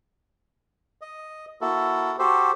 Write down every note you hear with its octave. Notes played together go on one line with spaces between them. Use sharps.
D#5
A#3 E4 F#4 A4
F#4 G4 A4 C5